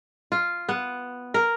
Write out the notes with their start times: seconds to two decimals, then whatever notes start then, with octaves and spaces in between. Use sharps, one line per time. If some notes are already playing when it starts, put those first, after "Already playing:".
0.32 F4
0.69 B3
1.34 A#4